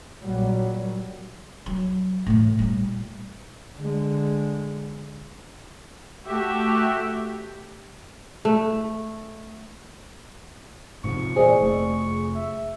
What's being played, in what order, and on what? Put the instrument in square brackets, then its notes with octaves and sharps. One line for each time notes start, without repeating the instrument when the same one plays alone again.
[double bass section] A#1 A#2 F#3 G3
[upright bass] F#3
A2 E3
A#2 G3
[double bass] D3 G#3
[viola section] A3 F#4 G4 E5 G5
[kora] A3
[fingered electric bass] G#2 C3 F3 [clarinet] C#6
[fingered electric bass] A#2 E3 [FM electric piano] G#4 [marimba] C5 D5 D#5
[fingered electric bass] F1 A3
[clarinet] E5